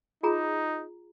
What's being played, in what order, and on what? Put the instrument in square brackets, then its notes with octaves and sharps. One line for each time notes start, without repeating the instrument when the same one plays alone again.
[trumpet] D#4 [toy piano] F4 G#4 A#5